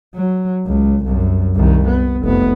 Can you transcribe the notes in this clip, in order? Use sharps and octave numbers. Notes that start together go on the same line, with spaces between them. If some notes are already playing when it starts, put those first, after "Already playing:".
F#3
C#2
C2 F#2
C2 D#3
B3
F1 B3